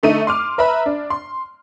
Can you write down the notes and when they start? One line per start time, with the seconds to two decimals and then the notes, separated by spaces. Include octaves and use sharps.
0.03 D3 A3 D#4 D#7
0.27 C6 D6 F6
0.58 B4 E5 A#5 B5
0.86 D4
1.10 C6